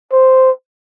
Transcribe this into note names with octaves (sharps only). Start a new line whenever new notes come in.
C5